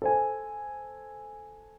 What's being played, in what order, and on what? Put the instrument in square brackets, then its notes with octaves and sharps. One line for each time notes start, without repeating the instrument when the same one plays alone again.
[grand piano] A4 C5 G#5